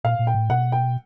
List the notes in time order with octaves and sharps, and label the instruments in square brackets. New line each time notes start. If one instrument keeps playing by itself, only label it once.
[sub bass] A#2 [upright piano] F5
[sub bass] A#2
[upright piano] G5
[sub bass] A2
[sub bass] B2 [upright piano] F#5
[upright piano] G5